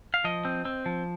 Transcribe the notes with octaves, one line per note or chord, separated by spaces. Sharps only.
F5
F3 D#5
C4
C4
F3